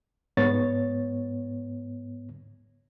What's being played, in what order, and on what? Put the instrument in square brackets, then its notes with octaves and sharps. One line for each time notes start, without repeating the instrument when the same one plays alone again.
[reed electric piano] G#2 B3 C#5 A6